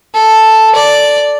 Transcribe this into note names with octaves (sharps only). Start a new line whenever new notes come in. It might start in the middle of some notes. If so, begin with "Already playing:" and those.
A4
D5